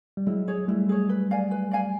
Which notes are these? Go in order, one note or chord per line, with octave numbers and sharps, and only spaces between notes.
G3
F#3 G#3 E4
G#4 C#5
G3 A3 E4
G#4 C#5
B4
D5 F5 G#5
B4
D5 F5 G#5